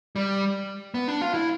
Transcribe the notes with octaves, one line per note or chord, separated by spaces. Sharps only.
G3
B3
D4
F4
E4